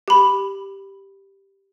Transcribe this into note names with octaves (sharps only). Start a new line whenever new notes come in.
G4 B5